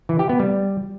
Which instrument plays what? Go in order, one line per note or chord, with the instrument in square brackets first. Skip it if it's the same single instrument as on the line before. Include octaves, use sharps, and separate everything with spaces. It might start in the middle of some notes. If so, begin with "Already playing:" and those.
[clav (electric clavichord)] E3
G4
B3
G3